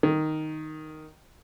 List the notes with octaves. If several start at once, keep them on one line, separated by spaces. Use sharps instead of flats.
D#3